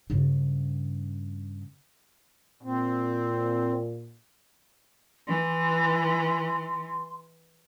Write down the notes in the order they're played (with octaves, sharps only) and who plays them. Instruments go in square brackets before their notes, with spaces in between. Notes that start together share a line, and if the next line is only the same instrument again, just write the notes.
[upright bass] G2 C#3
[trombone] A#2 [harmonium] C4
[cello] E3 [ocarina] C6